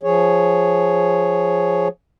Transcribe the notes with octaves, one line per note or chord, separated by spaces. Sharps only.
F3 G#4 C#5